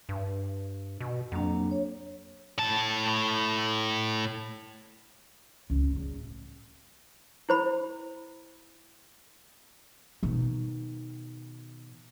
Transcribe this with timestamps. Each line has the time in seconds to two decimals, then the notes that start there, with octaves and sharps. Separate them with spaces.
0.09 G2
1.00 B2
1.32 F2 F#3 A#3 D4
1.71 C#5
2.58 A2 A5
5.70 C#2 D#3
5.92 C#3 G3
6.14 A1
7.49 E4 C5 B5
10.23 B2 D#3